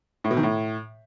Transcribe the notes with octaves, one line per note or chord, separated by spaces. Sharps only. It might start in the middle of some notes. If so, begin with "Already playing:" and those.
A2
B2
D#3
A2